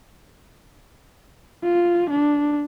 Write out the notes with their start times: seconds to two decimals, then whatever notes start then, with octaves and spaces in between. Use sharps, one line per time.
1.63 F4
2.10 D4